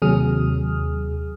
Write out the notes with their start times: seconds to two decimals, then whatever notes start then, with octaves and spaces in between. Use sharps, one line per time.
0.02 D#2 C3 F#3 G#4 D#6 F6